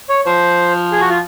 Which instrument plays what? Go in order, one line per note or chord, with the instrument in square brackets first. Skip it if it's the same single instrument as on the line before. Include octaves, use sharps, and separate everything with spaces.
[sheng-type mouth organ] C#5
[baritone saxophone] F3 [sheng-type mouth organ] C5
[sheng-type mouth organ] G#4
F#4
F4